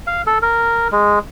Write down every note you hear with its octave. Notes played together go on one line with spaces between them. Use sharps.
F5
A4
A#4
G#3